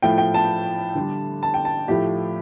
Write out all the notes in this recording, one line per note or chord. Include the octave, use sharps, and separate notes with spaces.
A2 F3 A3 G5
G5
A5
D3 G3
A5
G5
A5
A2 F3 A3 G4